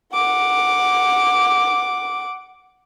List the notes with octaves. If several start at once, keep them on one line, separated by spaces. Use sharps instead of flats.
F#5 D6